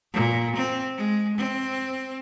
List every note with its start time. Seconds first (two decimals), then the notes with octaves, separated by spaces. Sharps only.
0.13 A#2
0.56 C4
0.98 G#3
1.38 C4